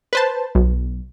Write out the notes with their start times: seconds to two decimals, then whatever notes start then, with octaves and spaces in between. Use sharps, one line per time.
0.13 B4 C5 A5
0.55 B1